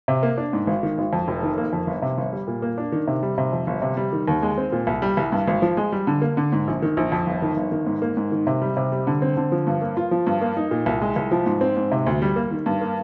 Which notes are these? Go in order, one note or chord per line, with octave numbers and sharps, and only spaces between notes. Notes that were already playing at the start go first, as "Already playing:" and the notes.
C3
A#3
D4
G#2
G#1
D#3
G#1
F2
F1
D#3
A#3
F2
G1
C3
G1
G3
A#2
A#3
D4
D#3
C3
G3
C3
F2
G1
C3
G3
D#3
D#2
G#3
C4
A#2
C2
G3
C2
G2
G#1
F3
G#3
G3
D3
A#3
D3
G#2
A#1
D#3
A#1
F2
G1
D#3
G1
D#3
G#2
A#3
G#2
D#3
C3
G3
C3
G3
D3
C4
D3
F3
G2
A#3
F4
F3
G2
A#3
D#4
A#2
C2
G#3
C2
F3
G#2
C4
G#2
C3
D2
G3
A#3
D#3
G2
A#3